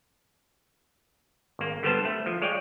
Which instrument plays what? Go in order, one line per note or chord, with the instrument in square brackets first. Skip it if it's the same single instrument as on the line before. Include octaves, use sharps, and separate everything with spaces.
[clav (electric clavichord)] G#1 A#3
D3 G3 B3 C5 A5
A3
F3
G#3 C#5 D5 F5 G5